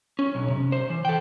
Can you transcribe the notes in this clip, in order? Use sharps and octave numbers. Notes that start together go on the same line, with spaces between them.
C#4
B1
C3
C5
E3
A4 G5